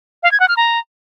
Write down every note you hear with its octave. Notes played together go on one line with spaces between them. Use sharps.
F5
G#6
F#5
F6
A#5